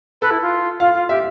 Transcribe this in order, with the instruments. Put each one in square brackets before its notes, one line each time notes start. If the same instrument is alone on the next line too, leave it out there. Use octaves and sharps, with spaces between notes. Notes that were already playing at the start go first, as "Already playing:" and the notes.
[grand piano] A4 [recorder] B4
[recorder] E4
F4
[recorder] F4 [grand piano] F5
[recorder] F4
[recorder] G4 [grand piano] E5